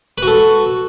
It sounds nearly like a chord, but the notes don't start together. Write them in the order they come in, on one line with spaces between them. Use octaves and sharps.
B4 F#4 A4